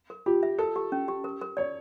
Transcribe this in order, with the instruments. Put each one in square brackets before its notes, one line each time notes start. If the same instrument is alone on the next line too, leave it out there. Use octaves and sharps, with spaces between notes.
[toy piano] A#4
[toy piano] F4 [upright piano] G4
[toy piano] E5
[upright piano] A4 [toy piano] A#4
[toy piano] G4
C#4
G4
A#4
A#4
[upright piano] C#5 [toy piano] D5